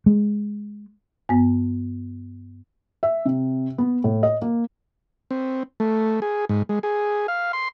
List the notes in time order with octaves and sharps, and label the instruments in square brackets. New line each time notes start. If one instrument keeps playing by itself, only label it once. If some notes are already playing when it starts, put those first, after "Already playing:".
[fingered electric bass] G#3
[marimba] G2 B3
[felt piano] E5
C3
B3
A2
D#5
A#3
[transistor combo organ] C4
A3
G#4
G#2
G#3
G#4
F5
C6